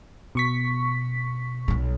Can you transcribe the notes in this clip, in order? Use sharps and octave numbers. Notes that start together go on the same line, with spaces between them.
B2 C#6 B6
B1 G3